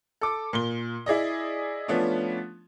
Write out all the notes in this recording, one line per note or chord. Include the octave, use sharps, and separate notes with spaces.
A4 D6
A#2 G7
E4 G#4 D5 D#5
F3 A3 B3 C#4 D4